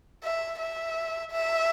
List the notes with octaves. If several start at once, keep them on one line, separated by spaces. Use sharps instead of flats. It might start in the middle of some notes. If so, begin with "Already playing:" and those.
E5
E5
E5